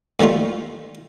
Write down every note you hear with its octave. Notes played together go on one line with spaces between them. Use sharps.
A2 D#3 G3 A3 F4